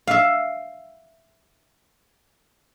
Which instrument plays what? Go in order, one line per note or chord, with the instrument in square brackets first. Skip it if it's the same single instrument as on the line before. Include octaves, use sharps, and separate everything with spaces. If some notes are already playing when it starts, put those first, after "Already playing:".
[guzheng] E5 F5